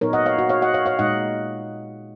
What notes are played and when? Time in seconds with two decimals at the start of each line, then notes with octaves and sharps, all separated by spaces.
0.01 A#2 F#3 B3 D#4 A#4 C#5
0.13 D#5 F#5
0.26 C#5 F5
0.38 F#4
0.49 C#5 F5
0.62 D#5 F#5
0.74 C#5 F5
0.86 C#5 F5
0.99 A#2 G#3 D#4 D#5 F#5